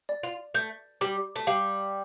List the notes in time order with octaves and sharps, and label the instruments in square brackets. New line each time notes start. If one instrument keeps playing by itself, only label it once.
[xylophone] D5
[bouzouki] F4
[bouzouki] A3 [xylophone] G6
[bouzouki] G3 [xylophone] D6
[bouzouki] A3
[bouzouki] G3 [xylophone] F5